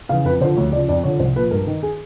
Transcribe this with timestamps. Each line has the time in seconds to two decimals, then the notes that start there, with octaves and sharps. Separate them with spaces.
0.09 C#3 F5
0.12 E3
0.24 F2 B4
0.41 D3 C5
0.45 F3
0.56 D2 C#5
0.72 C#3 D5
0.75 F3
0.88 F2 D5
1.04 D3 F3 C#5
1.20 C2 C5
1.36 A#2 F3 B4
1.51 G2 A#4
1.67 D#3
1.83 G#4